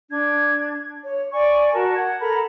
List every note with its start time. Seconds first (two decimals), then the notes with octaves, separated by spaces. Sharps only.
0.10 D4 G#6
1.04 C#5
1.32 D5 G#5 C#6
1.73 F#4 A#4 A5
1.96 F#5 G#6
2.20 A4 A#4 A#5 B5